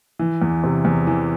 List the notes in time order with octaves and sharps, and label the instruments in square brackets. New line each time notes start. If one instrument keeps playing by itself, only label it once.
[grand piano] E3
E2
C3
E2
E3